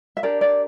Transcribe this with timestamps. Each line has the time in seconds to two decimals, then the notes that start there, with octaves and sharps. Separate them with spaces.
0.17 E5
0.23 D4 G4 A#4 D5
0.41 D5